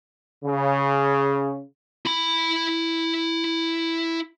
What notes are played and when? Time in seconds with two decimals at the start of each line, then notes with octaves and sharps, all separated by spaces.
0.45 C#3
2.06 E4 B5